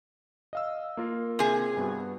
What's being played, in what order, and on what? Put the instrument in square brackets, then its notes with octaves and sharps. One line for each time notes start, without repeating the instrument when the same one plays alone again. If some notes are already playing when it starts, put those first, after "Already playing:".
[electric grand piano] D#5 F5 E6
A#3 F4 A#4
[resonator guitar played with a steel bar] C3 G#4
[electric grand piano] G2 B3 F#4